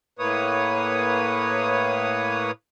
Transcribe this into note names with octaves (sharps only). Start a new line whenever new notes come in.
A2 A#3 B4 C#5 D#6